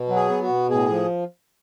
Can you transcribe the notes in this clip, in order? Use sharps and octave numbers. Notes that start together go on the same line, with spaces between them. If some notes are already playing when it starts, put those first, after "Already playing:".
Already playing: B2
F#3
G#4
B3
F#4
B2
A2 G#4
F3